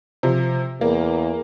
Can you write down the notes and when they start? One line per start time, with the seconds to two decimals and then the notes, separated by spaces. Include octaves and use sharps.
0.23 C3 F3
0.81 E2 A#3